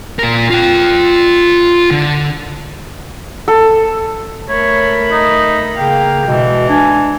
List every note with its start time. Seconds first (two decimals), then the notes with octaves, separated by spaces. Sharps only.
0.19 A#2 A#4
0.51 F4 G5
1.91 D3
3.48 A4
4.49 A3 A#4 C#5 B5
5.11 D#4
5.78 C#3 A#3 F5 G5
6.27 G#2 B2 D3 E3
6.70 D4 G#5